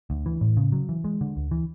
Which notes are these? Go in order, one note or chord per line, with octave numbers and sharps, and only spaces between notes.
D2
E3
A2
C#3
F#3
E3
G#3
D3
D2
E3